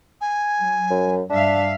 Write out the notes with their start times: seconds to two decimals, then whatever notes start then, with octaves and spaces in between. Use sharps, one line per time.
0.21 G#5
0.59 F#3
0.90 F#2
1.30 G2 D4 E5 F5